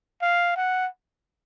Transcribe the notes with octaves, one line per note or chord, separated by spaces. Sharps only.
F5
F#5